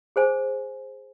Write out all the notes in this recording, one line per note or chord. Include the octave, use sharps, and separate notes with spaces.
G#4 C5 G#5